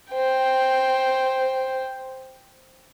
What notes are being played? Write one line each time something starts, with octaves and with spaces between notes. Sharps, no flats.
C5 G5